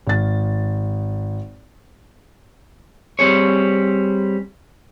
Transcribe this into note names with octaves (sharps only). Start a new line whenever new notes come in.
G#1 A6
G3 C4 G#4 C#5